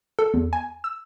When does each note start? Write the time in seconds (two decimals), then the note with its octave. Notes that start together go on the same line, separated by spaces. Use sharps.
0.19 A4
0.34 E2
0.53 G#5
0.84 E6